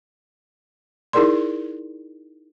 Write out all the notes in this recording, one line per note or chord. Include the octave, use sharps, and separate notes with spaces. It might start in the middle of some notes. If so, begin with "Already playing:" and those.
D#4 E4 G#4 A#4 D5 C6